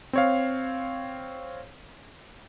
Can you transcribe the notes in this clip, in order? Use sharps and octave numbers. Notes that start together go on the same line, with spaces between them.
C4 C#5 F5